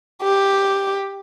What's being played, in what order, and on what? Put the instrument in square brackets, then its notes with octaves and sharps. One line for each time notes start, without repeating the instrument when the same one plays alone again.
[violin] G4